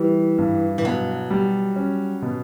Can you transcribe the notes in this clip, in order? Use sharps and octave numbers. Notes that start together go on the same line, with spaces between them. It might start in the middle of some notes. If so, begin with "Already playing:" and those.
Already playing: E3 G3
G2
E3
B2 F#3
G3
C#4
B2